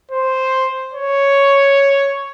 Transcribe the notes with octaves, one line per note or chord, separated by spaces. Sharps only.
C5
C#5